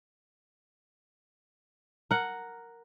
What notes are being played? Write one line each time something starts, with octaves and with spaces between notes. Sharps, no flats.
A#4 F#5